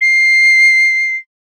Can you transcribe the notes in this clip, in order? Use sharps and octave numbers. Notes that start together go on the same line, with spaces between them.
C7